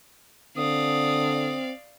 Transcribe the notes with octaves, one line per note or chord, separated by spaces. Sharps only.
D3 C4 D5 F5 D#6